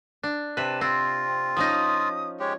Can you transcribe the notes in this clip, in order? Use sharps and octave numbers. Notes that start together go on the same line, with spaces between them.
D4
C3 B4 A5
C4 F4
F3 C#4 D#4 D#6
G#3 G4 C#5